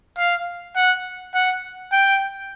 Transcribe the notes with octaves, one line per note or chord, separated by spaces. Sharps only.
F5
F#5
F#5
G5